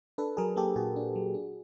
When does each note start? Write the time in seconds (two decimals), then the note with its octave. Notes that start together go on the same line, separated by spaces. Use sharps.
0.18 D4 A4 B4
0.37 F#3 G#4 A#4
0.56 A#3 G4 A4
0.76 A#2 F#4 G#4
0.96 D4
1.16 F#3
1.34 D4